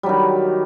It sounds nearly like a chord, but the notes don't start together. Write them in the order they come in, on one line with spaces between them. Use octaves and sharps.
G3 F#3 D#3